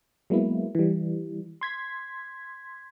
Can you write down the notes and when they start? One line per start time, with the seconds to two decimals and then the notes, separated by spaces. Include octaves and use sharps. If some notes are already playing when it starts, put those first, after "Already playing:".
0.30 F#3 G#3 A#3 B3 E4
0.75 E3 G3
1.61 C6 G#6 B6